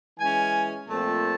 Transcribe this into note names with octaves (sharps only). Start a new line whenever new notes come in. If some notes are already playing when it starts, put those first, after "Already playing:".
E3 G#3 C#4 G#5
A#2 F3 A3 C4 A5